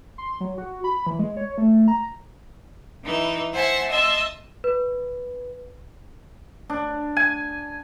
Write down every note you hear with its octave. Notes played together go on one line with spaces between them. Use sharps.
C6
F#3
F#4
B5
E3
G#3
C#5
A3
A#5
E3 D#4 B4
C5 E5 F#5 G#5 A5
D#5 E5 A5 C6 E6
B4
D4
G#5